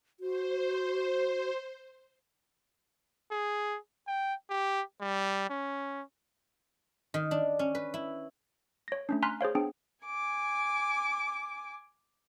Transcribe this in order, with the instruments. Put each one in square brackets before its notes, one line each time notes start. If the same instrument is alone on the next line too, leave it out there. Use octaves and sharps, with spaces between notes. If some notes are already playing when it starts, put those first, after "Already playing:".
[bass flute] F#4 [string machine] C5
[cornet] G#4
G5
G4
G3
C#4
[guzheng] D#3
D4
C#4
B4
E4
[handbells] C#5 A#6
A3 C#4 D4
G#5 A#5 C6 F6 F#6 B6
G#4 C5 C#5 F5
B3 D4 G#4 G5
[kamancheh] G#5 D6